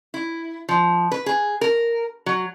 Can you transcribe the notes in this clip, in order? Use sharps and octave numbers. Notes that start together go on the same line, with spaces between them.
E4
F3
B4
G#4
A#4
F#3